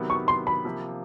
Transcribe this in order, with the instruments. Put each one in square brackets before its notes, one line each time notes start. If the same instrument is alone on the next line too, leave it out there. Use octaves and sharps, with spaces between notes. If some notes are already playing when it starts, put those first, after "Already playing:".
Already playing: [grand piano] C3 D#3 F#3 B3
[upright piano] C#6
C6
B5
[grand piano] C3 F3 A#3